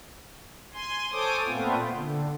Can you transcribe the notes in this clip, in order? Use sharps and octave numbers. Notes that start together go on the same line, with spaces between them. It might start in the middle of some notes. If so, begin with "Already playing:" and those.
G#5 C6
A4 C5 C#5 G#5 D6 D#6
A#2 A3 B3 C4 F4
D3